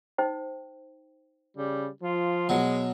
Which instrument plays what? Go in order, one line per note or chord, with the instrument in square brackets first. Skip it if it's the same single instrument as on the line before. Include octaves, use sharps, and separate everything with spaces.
[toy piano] D#4 C5 G5
[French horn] C#3 [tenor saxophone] G3
[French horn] F3 [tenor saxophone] F4
[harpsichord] B2 F#3 [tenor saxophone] G#3